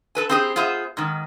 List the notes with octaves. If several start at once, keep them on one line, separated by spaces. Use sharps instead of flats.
A4 B4 G#5
C4 E4 G4 G#4 A#4 C5
B3 F4 G#4 C5 E5
G#2 D#3